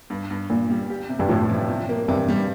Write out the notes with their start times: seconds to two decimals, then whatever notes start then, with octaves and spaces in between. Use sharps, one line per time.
0.10 G2
0.31 G2
0.50 G2 A#2
0.70 G3
0.90 G4
1.09 C3
1.19 G2
1.29 A2 F3
1.49 C3
1.69 C3
1.89 A#3
2.08 G2 C3
2.29 G3